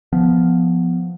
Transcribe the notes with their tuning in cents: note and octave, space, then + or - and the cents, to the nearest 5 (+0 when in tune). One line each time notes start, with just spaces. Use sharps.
F3 +0 B3 +0